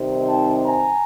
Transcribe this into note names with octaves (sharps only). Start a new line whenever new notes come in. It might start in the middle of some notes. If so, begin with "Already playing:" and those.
Already playing: C3 D#3 G3 C4 D#4
G5 A5
G#5 A#5